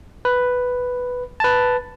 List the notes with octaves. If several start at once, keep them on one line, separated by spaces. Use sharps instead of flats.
B4
B4 A5